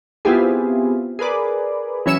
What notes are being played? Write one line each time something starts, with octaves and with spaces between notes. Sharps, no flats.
B3 C4 E4 F4 G4 G#4
G#4 A#4 B4 D5
E3 F#3 C#4 E5 C#7 E7